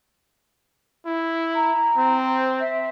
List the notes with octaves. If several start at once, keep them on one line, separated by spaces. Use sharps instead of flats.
E4
A#5
C4
E5